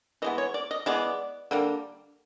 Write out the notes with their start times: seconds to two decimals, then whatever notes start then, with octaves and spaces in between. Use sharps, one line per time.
0.22 E3 G#3 B3 D#5
0.38 C#5
0.54 D5
0.71 D#5
0.86 E3 G#3 B3 D5
1.51 D3 G3 A#3